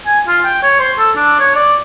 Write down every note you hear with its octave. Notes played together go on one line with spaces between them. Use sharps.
G#5
F4
G5
C#5
C5
A4
D4
C#5
D5